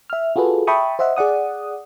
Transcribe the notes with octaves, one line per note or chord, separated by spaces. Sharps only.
E5 F6
F4 F#4 G#4 A4 B4
E5 G5 A5 B5 C#6 D#6
C5 D#5 E5 F#5
G#4 D5 F#5 D#6